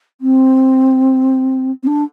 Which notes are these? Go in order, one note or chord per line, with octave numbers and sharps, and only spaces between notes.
C4
C4
D4